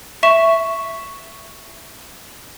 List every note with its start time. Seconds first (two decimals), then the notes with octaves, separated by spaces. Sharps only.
0.23 E5 C#6 E7